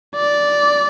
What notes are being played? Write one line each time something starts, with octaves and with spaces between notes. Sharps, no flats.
D5